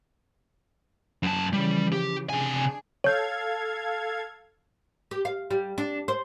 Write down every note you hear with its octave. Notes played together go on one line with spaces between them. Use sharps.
F#2 A5
C#3 E3 F3 G3
G4
C3 D4 G#4 G#5
A4 C#5 F5 G6 G#6
G4
F5
G3
D4
C5